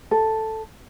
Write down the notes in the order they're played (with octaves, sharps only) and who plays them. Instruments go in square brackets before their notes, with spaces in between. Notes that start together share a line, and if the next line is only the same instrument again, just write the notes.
[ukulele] A4